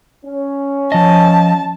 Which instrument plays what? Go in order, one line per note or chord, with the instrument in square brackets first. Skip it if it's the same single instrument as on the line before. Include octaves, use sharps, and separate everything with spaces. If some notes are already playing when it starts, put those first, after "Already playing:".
[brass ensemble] C#4
[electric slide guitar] F3 D#5 [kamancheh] A5